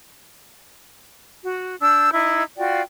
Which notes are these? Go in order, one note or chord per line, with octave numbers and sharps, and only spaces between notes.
F#4
D4 E6 G6
D#4 E4
F4 F#4 D5 G5